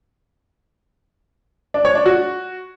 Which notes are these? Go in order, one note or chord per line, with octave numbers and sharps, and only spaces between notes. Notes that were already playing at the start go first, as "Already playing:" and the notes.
D4
C#5
D4
F#4